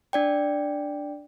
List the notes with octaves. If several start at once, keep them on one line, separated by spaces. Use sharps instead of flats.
D4 D5 G5